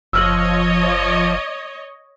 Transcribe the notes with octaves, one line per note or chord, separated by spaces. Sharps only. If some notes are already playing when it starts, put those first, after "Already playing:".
F#1 F3 C#5 D#5 E6 F6 F#7